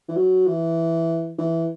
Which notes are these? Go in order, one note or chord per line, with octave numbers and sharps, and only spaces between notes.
E3
F#3
E3
E3